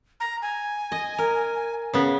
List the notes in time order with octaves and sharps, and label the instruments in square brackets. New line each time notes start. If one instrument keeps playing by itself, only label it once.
[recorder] A#5
G#5
[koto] D#5
A#4
C#3 B3